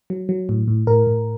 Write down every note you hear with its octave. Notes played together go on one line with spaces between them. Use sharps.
F#3
F#3
A2
A2
A2 A#4
A2